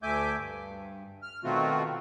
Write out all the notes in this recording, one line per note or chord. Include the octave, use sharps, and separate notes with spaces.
D2 A3 E5 G#5 D6 G6
G2
F6
B2 D#3 A3 C4 F4 F#4